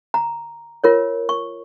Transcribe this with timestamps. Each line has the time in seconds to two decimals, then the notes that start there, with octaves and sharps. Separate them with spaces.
0.14 A#5
0.84 F4 A#4 C#5
1.29 C#6